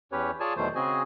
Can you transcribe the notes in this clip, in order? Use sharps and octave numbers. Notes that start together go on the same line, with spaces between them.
E2 C#4 G4 B4 C#5
F4 G#4 C#5 D5 G#5 A5
E2 B2 D#3 F#3 A3 C5
C#3 C4 F#4 G#4 D#5 G#5